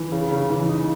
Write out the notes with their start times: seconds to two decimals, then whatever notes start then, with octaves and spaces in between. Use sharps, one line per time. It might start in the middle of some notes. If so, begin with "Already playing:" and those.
Already playing: E3
0.12 C#3
0.31 C#3
0.50 E3
0.69 D#4